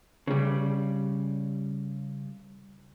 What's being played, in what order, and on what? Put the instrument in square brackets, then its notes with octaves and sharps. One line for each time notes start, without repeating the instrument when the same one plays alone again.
[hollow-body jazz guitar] C#3 G3